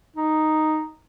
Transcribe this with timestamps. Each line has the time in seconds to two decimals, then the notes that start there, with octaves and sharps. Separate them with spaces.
0.16 D#4